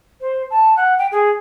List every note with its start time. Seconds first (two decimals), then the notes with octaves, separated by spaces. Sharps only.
0.21 C5
0.50 A5
0.77 F#5
0.98 G5
1.12 G#4